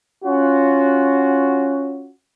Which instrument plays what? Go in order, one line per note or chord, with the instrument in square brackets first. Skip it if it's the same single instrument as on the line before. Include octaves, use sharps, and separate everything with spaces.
[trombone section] C#4 F4 F#4